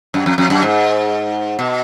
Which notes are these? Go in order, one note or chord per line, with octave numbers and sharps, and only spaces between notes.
F#2
F2
F2
F#2
G#2
B2